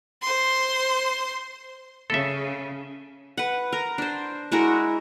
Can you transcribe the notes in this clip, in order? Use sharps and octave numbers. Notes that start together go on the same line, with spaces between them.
C5 C6
C#3 A4 E5
B4 F#5
A#4
D4 C5
G#3 E4 F#4 A#4